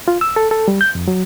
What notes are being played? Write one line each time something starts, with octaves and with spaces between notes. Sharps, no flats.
F4
E6
A4
A4
G3
G6
F2
F#3